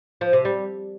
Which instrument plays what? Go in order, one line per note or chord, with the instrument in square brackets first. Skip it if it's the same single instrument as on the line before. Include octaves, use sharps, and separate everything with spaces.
[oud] F3
C3
G3